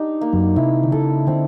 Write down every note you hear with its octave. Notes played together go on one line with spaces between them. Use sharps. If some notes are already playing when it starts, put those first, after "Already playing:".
Already playing: D4 D#4 G4
A#3
F#2 F#3
C3 E4
D3
C#3 A4
D3 C4